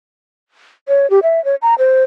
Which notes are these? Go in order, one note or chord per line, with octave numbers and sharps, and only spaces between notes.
C#5
G4
E5
C#5
A#5
C5